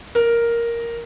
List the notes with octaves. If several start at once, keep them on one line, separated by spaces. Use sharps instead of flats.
A#4